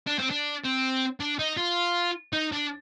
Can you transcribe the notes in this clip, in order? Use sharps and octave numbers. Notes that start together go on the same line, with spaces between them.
D4
C4
D4
C4
D4
D#4
F4
D#4
D4